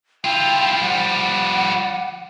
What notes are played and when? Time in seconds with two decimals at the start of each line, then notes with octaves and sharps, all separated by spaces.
0.24 E4 F4 G5
0.81 F3 G3 F#5